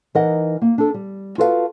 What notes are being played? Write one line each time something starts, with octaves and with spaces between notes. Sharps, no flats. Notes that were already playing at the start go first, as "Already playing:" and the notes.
E3 D#4 A#4 D#5 F#5
A#3
D4 A4
G3
F4 F#4 A4 B4 D5 F5